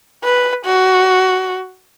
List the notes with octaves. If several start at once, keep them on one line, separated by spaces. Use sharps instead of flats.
B4
F#4